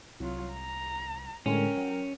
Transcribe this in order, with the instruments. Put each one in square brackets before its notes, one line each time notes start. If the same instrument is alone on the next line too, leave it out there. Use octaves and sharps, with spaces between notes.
[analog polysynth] C2 [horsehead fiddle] F#3 F4
[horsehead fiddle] A#5
[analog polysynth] A2 D3 G#3 [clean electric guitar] C#4 [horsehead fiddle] A#4 G5
[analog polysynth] F#3